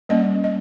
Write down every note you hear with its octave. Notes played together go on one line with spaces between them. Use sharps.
G3 A#3 C#4 D#5
D#5